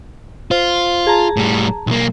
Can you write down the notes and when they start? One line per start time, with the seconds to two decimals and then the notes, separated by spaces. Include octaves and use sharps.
0.51 F4 C5
1.07 G#4 A5 A#5
1.37 A2 G3
1.87 B1 A#3